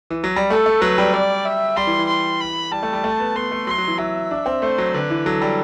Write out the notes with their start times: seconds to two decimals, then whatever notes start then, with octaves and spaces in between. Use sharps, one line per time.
0.10 E3
0.24 F#3
0.36 G3
0.50 A3 A4
0.66 A3
0.81 F#3 B4
0.98 G3
1.13 D5
1.45 E5
1.76 G3 C6
1.87 E3
1.99 E3
2.08 C6
2.40 B5
2.71 G3 A5
2.83 A3
2.93 G3
3.04 A3
3.20 B3
3.36 B3 C6
3.52 A3
3.67 F#3 C6
3.78 F#3
3.88 E3
3.98 F#3 E5
4.31 D4
4.46 C4
4.62 A3 C5
4.78 F#3
4.94 D3 B4
5.10 E3
5.25 F#3 A4
5.42 G3